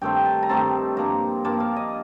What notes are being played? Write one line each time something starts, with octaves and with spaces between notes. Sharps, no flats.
G2 D#3 A3 C4 G5
A5
A#5
G2 D#3 A3 C4 A5
G2 F3 A#3 A#5
G2 F3 A#3 A5
F5
D#5